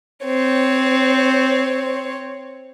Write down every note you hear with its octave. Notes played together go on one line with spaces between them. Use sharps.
C4 C#5